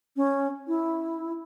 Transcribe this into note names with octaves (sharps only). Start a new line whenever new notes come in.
C#4
E4